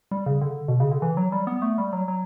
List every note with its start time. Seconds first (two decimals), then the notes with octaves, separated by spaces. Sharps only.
0.11 G3
0.26 C#3
0.42 D3
0.68 B2
0.80 C#3
0.91 D3
1.02 E3
1.17 F#3
1.32 G3
1.47 B3
1.62 A3
1.78 G3
1.93 F#3
2.08 F#3